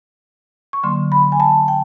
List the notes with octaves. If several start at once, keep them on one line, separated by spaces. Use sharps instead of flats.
C#6
D3 F#3 A#3 C6
B5
G#5
A5
G5